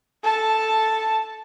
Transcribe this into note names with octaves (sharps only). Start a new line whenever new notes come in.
A4 A5